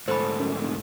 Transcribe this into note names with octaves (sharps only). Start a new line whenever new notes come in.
D2 G#2 A4 C5 B5
F#2
F1